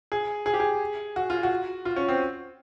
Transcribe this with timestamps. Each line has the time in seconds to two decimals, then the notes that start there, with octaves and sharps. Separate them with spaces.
0.12 G#4
0.46 G#4
0.54 G4
0.60 G#4
1.16 F#4
1.30 F4
1.43 F#4
1.85 F4
1.96 C#4
2.08 C4